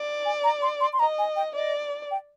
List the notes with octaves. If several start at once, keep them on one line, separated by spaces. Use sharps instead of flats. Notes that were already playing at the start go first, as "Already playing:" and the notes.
Already playing: D5
G#5
A#5
C6
C6
C6
D#5 A#5
G#5
G5
D5 D#5
G5